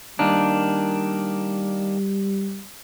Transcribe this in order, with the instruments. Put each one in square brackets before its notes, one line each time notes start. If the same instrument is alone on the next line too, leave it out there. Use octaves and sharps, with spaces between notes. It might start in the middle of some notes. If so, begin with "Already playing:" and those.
[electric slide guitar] D#3 A#3 D4 [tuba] G3